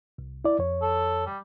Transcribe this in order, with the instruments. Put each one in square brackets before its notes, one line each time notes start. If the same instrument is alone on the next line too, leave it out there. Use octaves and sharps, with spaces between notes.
[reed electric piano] C2
E4 D5
F2 C#5
[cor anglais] A4
G3